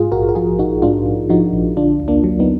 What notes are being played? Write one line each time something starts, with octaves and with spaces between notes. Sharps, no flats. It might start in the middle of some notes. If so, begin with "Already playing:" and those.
Already playing: G#2 F4 G#4
A#1 F#4 A#4
A#4
F3 F4 G#4
A#1 D#4 F#4
G#2 D4 F4
A#1
F3 D#4 F#4
A#1
D3 D4 F4
D2
A#3 D4
F#3
B3 D#4